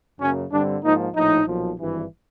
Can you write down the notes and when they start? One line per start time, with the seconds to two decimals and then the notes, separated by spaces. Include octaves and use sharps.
0.20 F#2 C#3 F#3 A#3 C#4
0.52 G2 D3 G3 C4 D4
0.83 G#2 F3 A#3 D#4
1.15 A#1 A2 F3 D#4
1.47 B1 A#2 F3
1.79 G#1 G2 E3